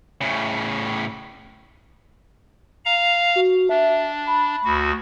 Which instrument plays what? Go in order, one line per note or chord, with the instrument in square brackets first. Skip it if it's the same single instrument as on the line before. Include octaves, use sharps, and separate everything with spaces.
[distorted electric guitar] A2 C#3
[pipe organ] F5 A#5
[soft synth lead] F#4
[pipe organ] D4 [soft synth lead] E5
[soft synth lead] B5
[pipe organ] D2 F#4